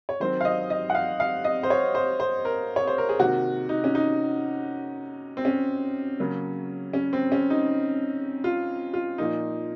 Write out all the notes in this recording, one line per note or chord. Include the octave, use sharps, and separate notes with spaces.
C#5
D#3 F#3 C4 C5
F5
D#5
D#5
F#5
F5
F5
D#5
C5
C#5
C5
C5
A#4
C#5
C5
A#4
G#4
C3 D#3 A#3 F#4
D#4
C#4
D#4
C4
C#4
C#3 F#3 A#3
C#4
C4
C#4
D#4
F4
F4
A#2 F3 A#3 D#4